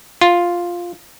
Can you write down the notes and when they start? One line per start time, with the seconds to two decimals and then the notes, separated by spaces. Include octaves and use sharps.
0.21 F4